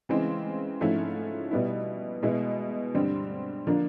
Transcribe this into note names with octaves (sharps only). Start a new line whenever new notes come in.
C#3 E3 G#3 C4
G#2 F3 A3 C#4 E4
B2 G3 B3 E4
B2 G#3 B3 E4
G2 D3 G3 C4
D3 F3 A#3 D4